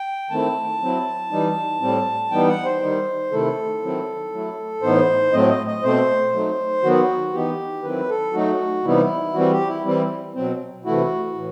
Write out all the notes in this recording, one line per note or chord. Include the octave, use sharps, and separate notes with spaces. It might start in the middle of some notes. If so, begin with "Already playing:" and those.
Already playing: G5
D#3 A3 C4 E4 A5
F#3 C4 E4
E3 G3 D#4
A2 G3 C4
E3 G3 B3 D#4 G5
F#5
C5
D#3 G3 D#4
C3 D#3 A3 E4 A4
D#3 F#3 C4 E4
F#3 A3 E4
A2 E3 B3 D#4 C5
A2 F#3 A3 C4 D#5
D#5
D#5
B2 A3 C4 C5
F#3 A3 D#4
D#3 F#3 B3 F#4
E3 B3 D#4 G4
D#3 F#3 C4 E4 B4
A4
F#3 A3 D#4 F#4
C3 E3 G3 B3 D#4 E4
E3 G3 C4 F#4
G4
E4
E3 G3 C4 E4
B2 F#3 C4
C3 E3 A3 E4 F#4
A2 E3